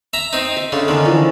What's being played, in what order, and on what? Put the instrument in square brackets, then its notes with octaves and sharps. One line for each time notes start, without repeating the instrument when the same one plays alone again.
[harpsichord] E5 A#5
C4 D#4
[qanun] E5
[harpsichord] C#3 [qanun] D4 A4 C6
[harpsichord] D3 [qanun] D#3 C#4 D#5
[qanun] E3 F3